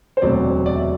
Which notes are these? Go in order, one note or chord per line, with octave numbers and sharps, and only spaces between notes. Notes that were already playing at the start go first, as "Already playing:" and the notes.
C5
E1 D2 C3 F#3 C4 D5
D5
E5